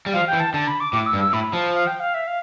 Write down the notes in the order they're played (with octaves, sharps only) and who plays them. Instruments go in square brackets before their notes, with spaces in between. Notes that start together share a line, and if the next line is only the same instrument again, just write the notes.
[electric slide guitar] G3
[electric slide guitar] F3 [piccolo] F5
[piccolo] G5
[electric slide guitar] E3
[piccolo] A5
[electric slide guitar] D3 [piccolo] A5
[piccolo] B5
D6
[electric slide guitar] A2 [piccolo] D6
[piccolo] E6
[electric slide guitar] G2
[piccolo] E6
[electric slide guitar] A2 [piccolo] B5
[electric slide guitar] F3 [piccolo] A5
[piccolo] F5
G5
F5
E5
F5